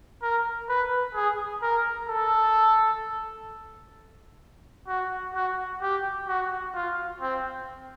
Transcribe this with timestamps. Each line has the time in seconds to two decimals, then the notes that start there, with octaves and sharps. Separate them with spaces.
0.23 A#4
0.69 B4
1.15 G#4
1.62 A#4
2.09 A4
4.88 F#4
5.35 F#4
5.82 G4
6.28 F#4
6.75 F4
7.21 C4